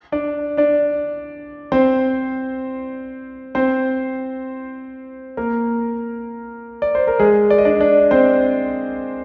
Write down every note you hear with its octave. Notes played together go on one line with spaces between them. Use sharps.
D4 D5
D4 D5
C4 C5
C4 C5
A#3 A#4
D5
C5
A#4
G#3 G#4
D5
D#5
D4 D5
D4 D5
C4 C5